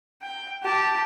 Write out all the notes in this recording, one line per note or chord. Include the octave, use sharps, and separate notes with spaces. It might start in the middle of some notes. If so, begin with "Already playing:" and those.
G5
G4 A5